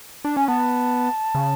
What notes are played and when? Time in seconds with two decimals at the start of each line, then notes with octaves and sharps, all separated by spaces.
0.25 D4
0.36 C#4 G#5
0.47 B3 A5
1.35 C#3